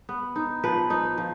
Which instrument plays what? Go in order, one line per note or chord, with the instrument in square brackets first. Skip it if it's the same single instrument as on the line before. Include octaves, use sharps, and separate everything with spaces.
[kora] B3
D#4
F3 B4
D#4
F3